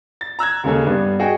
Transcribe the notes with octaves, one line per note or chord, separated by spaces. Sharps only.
A6
A#5 E6 F#6 G#6
D#2 C#3 G#3 C#4 A4
G2 B3 D4
F#4 G#4 D#5 G5